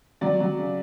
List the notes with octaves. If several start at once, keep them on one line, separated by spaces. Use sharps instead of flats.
F#3 D5
F#3
C#3